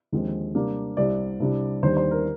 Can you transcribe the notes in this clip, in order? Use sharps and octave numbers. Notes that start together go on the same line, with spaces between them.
D#2 D3 F3 G#3 C4
C3 G3 A#3 D4
C2 C3 G3 D5
C2 C3 G3 D4
D#2 D#3 G3 D4 C5
C5
A#4